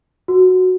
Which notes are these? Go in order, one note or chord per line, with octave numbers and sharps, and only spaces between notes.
F#4